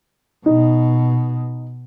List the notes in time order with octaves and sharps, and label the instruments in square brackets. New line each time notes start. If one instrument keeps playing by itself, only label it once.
[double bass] B2 [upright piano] D#4